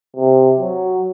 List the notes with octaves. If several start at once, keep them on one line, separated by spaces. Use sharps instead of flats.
C3
F#3